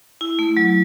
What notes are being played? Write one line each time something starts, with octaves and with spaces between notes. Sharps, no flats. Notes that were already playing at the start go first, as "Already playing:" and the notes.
E4
A3
F#3